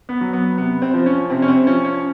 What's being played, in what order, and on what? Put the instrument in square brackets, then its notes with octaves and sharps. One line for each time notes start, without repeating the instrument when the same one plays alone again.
[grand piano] B3
F#3
B3
C3 B3
C4
F3
C#4
C3 C4
C#4
C4
F3 C#4
C#4